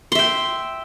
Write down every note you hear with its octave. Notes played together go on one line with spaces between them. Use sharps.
E5 G5 C6